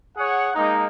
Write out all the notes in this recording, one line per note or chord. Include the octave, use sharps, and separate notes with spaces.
G#4 C#5 F#5
G#3 A#3 D#4